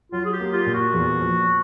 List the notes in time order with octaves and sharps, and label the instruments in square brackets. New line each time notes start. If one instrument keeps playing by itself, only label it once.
[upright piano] F#3 [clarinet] F4
[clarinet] G#4
G4
[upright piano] A#3
[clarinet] F4
[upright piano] A#2
[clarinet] F#4
[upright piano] E2
F3